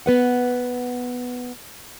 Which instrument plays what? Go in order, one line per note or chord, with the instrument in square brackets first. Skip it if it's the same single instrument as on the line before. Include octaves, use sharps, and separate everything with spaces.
[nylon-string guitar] B3 B4 F#5